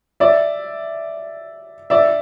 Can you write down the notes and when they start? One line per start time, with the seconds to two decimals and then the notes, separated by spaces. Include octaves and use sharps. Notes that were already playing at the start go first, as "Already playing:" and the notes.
0.20 D5 E5
1.90 D5 E5